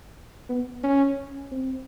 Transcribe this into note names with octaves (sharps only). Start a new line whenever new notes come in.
B3
C#4
C4